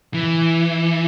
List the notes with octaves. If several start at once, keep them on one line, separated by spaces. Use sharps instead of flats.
E3